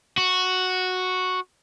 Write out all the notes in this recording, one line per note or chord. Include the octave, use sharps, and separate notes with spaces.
F#4